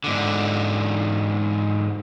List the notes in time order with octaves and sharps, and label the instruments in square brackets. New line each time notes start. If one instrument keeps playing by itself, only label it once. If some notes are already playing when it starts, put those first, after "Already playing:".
[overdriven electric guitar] G#2 D3